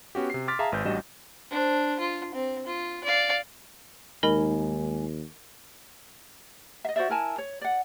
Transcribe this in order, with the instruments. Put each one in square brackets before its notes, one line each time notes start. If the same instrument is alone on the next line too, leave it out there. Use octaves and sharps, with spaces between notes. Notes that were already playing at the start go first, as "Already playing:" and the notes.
[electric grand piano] B3 C#4 F#4 G4
C3 C7
C6 D6 F6 A6 B6
G#4 E5 F5 A5 A#5
G#1 B4 G6
A1 G3 D4 F#4 D#5 E7
[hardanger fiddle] D4 C5
F4
C4
F4
D5 F5
[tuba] D#2 [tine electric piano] G#3 D#4 G#5 [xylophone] A#4 D#5 B5
[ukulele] D#5 E5
F#4 C5 D5 E5
E4 A#4 G#5 A5
C#5
D5 F#5